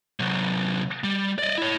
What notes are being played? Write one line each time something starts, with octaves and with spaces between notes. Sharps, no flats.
C3 F#3
G3
D5 D#5
E4 C#5